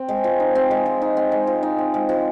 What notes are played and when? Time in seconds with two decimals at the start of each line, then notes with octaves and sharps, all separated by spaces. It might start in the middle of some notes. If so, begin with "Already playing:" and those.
Already playing: C4
0.08 G#3
0.24 F3
0.40 D#4
0.55 C4
0.71 G#3
0.86 F3
1.02 D#4
1.17 C4
1.32 G#3
1.47 F3
1.63 D#4
1.78 C4
1.94 G#3
2.09 F3